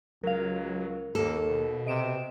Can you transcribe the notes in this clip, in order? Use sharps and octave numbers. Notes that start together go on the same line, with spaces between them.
C#2 F#3 A#4 F5
D#2 A#3 A4
B2
C3 D#5 D7 E7